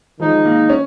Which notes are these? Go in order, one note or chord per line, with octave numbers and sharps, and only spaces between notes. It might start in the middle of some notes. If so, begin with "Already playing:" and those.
D#3 F3 G#3 D#4
A#3
C#4